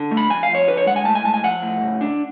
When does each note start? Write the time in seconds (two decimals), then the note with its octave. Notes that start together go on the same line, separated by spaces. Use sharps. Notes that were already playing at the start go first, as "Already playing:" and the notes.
Already playing: D3
0.11 A3
0.17 B5
0.30 F2 G#5
0.43 F5
0.49 F3
0.55 C#5
0.67 D3 B4
0.77 C#5
0.86 G#3 F#5
0.96 G#5
1.05 A2 A5
1.15 G#5
1.25 G#3 A5
1.34 G#5
1.43 F3 F#5
1.62 A2
1.82 C#3
2.01 D4